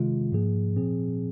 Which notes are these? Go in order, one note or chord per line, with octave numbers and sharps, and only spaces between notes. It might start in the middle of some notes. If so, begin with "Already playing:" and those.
Already playing: C3 D#3 G#3 F4
G#2 F3 A#3 G#4
A#2 F3 C4 G#4